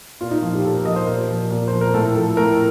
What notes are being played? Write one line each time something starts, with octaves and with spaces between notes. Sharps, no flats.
A#2 F4
D#4
F3 F4
G4
A#2 A4
A#4
F3 D#5
C5
A#2 A#4
F3
A#2
F3 C5
A#4
A2 A4
F3 A4
A2 A#4